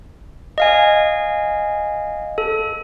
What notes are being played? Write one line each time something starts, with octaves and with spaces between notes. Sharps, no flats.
D#5 F5 G#5
A4